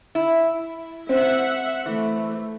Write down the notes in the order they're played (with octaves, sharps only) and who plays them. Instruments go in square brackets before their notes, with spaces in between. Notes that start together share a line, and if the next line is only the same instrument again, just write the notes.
[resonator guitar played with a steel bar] E4
[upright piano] C4 [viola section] E5 F#5
[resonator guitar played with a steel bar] E3 [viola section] A3